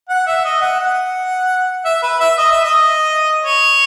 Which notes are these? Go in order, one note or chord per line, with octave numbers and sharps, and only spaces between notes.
F#5
E5
D#5
F#5
F#5
E5
B4
E5
D#5
E5
D#5
C#5